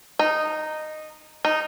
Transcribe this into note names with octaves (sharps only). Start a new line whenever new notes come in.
D#4
D#4